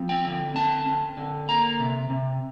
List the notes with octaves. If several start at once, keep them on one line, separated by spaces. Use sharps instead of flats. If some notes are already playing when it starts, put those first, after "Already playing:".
Already playing: F3 C4
G5
D3
C4 A5
C4
D3
A#3 A#5
C3
C3